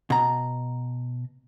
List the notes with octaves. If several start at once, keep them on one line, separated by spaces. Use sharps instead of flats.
B2 A#5